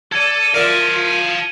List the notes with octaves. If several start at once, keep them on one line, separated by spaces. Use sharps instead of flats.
A4 D5 G#6 C#7 D#7
F4 A#4 D5 E5 F5 A5